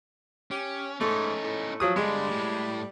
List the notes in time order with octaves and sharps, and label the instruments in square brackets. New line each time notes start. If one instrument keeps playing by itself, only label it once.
[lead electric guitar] C#4 [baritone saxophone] G4
[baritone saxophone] G#2 [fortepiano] A3 [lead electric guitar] C#4 D#4
[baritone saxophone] A2
[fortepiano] F3 F#3 D#6
[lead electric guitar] G2 D3 [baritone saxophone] G3 [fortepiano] G#3
[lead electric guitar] A2